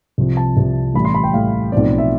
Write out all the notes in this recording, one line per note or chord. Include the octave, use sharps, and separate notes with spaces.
C2 C3 F3
A5
C2 C3 F3
A1 A2 G3 B5
C6
B5
G5
A1 A2 G3 F5
B1 A2 F3 C4 D5
E5